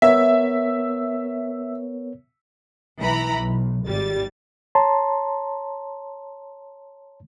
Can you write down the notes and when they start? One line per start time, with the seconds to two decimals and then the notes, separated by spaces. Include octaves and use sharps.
0.02 B3 A#4 C#5 E5
3.00 B1 E3 A#5 B5
3.36 B1
3.85 G#1 G3 A6
4.75 C#5 A5 A#5 C6